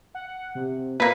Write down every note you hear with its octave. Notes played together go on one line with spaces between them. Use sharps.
F#5
C3
A#2 A#3 B4